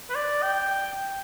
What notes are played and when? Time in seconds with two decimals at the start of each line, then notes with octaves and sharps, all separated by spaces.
0.10 B4
0.15 D5
0.42 G5